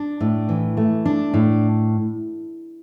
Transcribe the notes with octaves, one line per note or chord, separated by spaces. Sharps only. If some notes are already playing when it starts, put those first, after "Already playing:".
Already playing: D4
A2
E3
A3
D4
A2